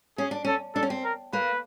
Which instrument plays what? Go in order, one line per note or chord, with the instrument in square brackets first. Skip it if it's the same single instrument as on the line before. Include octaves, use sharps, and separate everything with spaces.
[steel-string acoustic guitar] C#4 [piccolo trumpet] G#4
[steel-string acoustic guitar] D4
[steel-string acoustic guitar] C#4 [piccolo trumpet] A4
[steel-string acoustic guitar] D4 [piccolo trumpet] A4
[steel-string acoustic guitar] C#4
C4
[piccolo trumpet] A#4
[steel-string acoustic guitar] A#3 [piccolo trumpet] B4